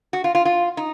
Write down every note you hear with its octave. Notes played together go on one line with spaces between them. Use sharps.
F#4
F4
F4
F4
D#4